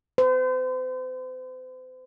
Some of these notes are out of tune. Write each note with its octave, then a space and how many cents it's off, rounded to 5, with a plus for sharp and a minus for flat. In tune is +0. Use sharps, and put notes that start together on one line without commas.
C5 -40